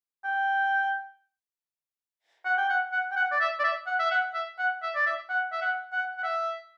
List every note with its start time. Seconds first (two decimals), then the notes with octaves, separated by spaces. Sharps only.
0.24 G5
2.45 F#5
2.58 G5
2.69 F#5
2.92 F#5
3.11 G5
3.16 F#5
3.32 D5
3.41 E5
3.59 D5
3.64 E5
3.87 F#5
3.99 E5
4.11 F#5
4.34 E5
4.59 F#5
4.83 E5
4.95 D5
5.06 E5
5.30 F#5
5.52 E5
5.61 F#5
5.93 F#5
6.18 F#5
6.23 E5